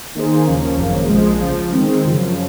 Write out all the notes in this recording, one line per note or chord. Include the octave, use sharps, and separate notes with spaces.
D#3 A#3 D#4 G#4 C5
D#2 C#3 F3 A#3 C#4
G#1 F#2 C#3 F3 A#3
A#1 A#2 F3 G#3
C#2 C#3 F3
D#3 G#3 C4
F#2 C#3 F3